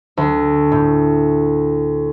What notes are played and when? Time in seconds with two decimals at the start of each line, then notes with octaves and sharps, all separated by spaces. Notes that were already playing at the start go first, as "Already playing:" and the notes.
0.17 D2
0.72 A2